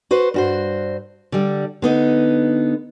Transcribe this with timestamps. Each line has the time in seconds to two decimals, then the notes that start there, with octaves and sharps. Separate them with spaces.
0.11 F#4 B4 C5
0.34 G2 F#4 C5
1.32 D3 G3
1.82 D3 B3 D#4